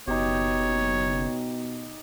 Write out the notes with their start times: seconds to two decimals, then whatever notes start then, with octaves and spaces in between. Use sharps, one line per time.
0.08 F#1 B2 D#4 G4 C#5